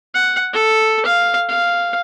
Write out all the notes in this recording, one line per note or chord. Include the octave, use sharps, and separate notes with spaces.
F#5
A4
F5
F5